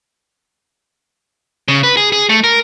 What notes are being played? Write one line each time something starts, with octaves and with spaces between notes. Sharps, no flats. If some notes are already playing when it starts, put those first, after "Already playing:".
C#3
B4
G#4
G#4
A3
A#4